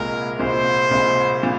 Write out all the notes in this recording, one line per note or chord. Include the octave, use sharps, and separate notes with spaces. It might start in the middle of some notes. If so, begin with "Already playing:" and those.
Already playing: C2 A#2 G#3 A#4
C2 A#2 G#3 C5
C2 A#2 G#3
A#2